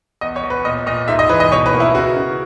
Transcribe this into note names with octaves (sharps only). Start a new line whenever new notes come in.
E2 D#5
C#5
E2
B4
A#2 D#5
A#2 D#5
G#2 E5
D#5
E3 B4
D#5
B2 C#5
B4
A#3
E4
C#3 F#4
C#3